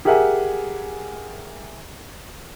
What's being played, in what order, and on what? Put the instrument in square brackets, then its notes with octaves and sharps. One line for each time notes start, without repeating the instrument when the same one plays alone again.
[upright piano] G4 G#4 A#4 E5 F#5 G#5